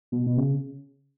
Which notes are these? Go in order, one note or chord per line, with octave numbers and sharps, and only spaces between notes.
B2
B2
C#3